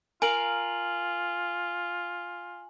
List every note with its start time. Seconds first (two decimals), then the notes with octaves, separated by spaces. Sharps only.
0.22 F4 A#4 F5 G#5 F#7